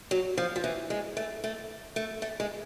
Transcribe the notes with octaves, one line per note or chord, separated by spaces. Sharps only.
F#3
F3
F3
E3
G#3
A3
A3
A3
A3
G#3